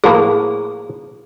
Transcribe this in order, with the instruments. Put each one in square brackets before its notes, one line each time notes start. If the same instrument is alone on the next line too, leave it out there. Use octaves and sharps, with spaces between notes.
[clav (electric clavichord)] A2 F3 A#3 [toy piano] G#4